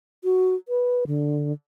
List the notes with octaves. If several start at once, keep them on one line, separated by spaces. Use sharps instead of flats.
F#4
B4
D3